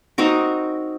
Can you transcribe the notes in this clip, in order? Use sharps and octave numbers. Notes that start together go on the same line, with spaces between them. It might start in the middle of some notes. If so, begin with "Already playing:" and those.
C4 D#4 F#4 A#4